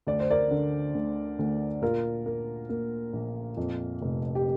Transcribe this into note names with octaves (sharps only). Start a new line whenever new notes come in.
D2 D5
C5
A#4 D5
D3
D2
D2
A#2 F4 A#4
A#3
A#3
A#1
F2
F1
G4